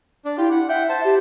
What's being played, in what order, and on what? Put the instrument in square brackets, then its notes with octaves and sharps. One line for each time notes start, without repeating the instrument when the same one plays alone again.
[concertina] D4
[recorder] E4 [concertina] F4 G4
[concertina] F#5
[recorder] E5 [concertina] F#5 G5
[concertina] C5 A5
[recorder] G4